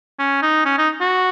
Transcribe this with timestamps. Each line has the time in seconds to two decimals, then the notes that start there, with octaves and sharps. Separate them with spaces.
0.19 C#4
0.42 D#4
0.65 C#4
0.78 D#4
1.01 F#4